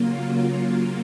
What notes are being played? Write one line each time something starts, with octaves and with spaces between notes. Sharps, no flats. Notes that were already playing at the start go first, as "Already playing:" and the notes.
Already playing: C#3 F#3 A#3 F4